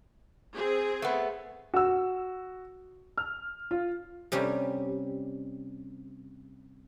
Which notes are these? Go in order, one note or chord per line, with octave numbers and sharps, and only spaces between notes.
C4 G#4
A3 B3
F#4 E6
F6
F4
C3 G3 C#4 G4